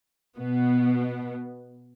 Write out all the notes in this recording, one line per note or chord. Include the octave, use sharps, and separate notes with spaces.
B2 B3